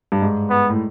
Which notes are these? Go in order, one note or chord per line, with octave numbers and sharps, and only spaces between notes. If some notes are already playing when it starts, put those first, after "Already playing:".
G2
G#2
B3
A2